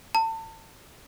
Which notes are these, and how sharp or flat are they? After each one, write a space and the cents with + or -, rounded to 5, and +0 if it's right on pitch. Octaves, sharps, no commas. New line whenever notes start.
A5 +30